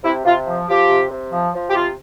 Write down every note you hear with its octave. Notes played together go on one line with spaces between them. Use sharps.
C3 E4
C3 F4
F3
F3 G4
C3
C3
F3
F3
G4
C3 F4